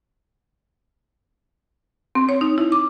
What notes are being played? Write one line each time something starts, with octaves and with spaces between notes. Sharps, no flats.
C4
C#5
D#4
E4
D6